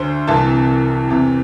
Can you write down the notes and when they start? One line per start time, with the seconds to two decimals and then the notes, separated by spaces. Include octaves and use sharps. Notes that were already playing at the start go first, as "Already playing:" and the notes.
Already playing: D2 D3 C5
0.27 C2 C3 E3 A5
1.09 E2 C3 E3